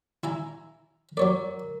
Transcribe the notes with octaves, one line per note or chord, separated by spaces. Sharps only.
E4 G#5 A#5
F#3 A#4 C#5 D5